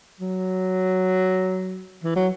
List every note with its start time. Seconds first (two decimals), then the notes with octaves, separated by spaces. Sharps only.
0.20 F#3
2.04 E3
2.16 F#3